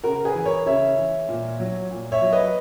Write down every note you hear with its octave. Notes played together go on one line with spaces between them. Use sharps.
C#3 F#4 A#4
G#4 B4
E3
A#4 C#5
C#3 C#5 E5
E3
A#2
F#3
A#2
C#5 E5
F#3
B4 D#5